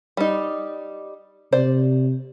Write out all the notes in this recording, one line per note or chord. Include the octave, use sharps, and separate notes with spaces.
G3 D#4
C3 C5 D5